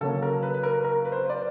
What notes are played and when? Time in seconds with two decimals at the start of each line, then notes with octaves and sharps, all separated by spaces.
0.01 C#3 F#3 A#3 C#4 A4
0.22 A#4
0.42 B4
0.54 B4
0.63 A#4
0.84 A#4
1.05 B4
1.12 C5
1.30 D5